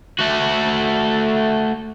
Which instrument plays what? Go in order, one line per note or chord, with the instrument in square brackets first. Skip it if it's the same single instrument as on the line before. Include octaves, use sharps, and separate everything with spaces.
[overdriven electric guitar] A3 F#4